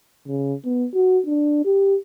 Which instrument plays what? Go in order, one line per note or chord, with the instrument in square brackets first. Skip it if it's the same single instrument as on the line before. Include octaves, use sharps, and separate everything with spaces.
[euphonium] C#3
B3
F#4
D4
G4